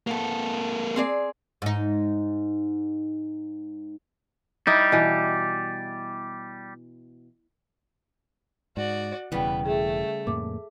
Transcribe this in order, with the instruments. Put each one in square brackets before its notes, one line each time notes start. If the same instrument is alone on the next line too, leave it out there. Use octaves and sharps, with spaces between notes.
[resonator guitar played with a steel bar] A2 B3 [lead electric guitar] A#3 A4
[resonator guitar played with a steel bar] C4 G#4 D5
[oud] G#2 D#4
[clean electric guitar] G3 [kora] D#4 E4
[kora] B2 E3
[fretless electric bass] G#2 [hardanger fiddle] F#4 D5
[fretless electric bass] E1 E3 [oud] C#3 G3 [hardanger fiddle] B3
[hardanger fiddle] A3 [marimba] G#4
[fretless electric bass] F2 A2 A#3 [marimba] D6